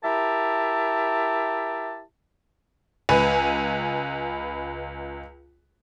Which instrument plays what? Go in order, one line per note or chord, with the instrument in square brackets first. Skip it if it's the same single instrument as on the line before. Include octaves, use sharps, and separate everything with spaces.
[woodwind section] E4 G4 A#4 E5 A5
[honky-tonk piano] C#2 B4 G#5